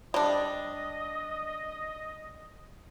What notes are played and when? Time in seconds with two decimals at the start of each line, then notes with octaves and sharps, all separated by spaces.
0.14 G3 D4 D#5